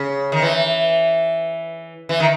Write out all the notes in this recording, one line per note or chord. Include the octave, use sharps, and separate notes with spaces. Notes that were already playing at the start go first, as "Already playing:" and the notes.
Already playing: C#3
D#3
E3
E3
D#3